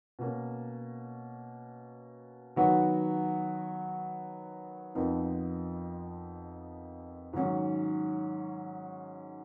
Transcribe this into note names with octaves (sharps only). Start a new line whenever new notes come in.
B2 A#3 C#4
D#3 F#3 B3 F#4
F2 F3 B3 D#4 A#4
G#2 D#3 F#3 C#4